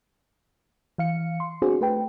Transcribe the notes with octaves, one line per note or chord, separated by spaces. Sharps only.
E3 F5 C#7
C6
B3 C4 D4 F#4 G#4 C5
A3 B4 G5